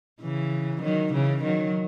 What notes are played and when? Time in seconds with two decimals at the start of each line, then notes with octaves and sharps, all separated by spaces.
0.21 C#3 E3
0.82 D#3 F#3
1.13 C#3 E3
1.43 D#3 F#3